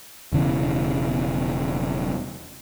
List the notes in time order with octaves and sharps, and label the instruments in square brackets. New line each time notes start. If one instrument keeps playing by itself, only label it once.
[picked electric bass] E1 C#3 E3